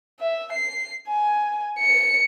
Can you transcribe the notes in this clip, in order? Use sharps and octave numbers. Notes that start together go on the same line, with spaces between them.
E5
C7
G#5
C#7